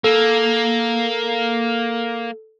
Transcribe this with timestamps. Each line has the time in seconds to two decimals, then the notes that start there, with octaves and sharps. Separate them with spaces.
0.04 A#3 A4